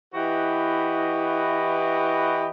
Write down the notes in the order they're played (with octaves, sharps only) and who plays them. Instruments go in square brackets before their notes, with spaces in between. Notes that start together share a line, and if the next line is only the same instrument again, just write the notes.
[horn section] E3 E4 F#4 G4 B4 D#5